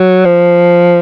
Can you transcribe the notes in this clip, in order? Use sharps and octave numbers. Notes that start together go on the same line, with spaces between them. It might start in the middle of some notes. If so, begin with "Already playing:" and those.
Already playing: F#3
F3